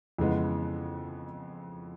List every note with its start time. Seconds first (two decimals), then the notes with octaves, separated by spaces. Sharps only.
0.18 F2 C#3 E3 G#3 B3